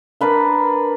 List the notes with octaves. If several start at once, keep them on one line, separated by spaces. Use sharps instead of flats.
D4 A#4 B4 F5